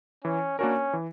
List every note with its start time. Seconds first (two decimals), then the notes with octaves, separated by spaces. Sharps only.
0.24 E3 C#4
0.59 A#3 C#4 D4 F#4 A#4
0.93 E3